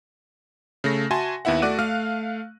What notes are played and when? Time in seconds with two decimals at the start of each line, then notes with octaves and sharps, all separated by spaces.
0.84 C#3 A3 A#6
1.11 F#4 E5 G#5 A5 C6
1.45 D#2 B3 E4 E5 F#5
1.62 A3 F#4 D5 D6 F#6 D#7
1.79 A3 F5 F6